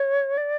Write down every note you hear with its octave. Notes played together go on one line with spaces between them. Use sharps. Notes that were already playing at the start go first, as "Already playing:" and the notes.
Already playing: C#5
D5